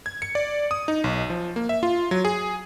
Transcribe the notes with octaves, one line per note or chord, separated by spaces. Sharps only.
G#6
C#7
D5
D#6
D#4
B1
F3
A#3
E5
F4
F#3
G#4